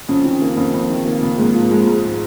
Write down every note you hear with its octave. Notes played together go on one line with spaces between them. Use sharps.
F2 C#4
D#3
A#3
F2
F2
D#3
A#3
F2
G#2 A#3
F3
G#3
G#2